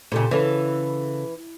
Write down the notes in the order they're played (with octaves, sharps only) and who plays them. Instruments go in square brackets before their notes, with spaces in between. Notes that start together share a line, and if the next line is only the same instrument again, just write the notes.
[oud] A#2 C#3 [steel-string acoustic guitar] G4 A4 C5
[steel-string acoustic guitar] C#3 A4 [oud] E3